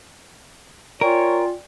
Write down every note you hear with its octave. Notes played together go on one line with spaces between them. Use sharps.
F4 A#4 C#5 D5 G5 G#5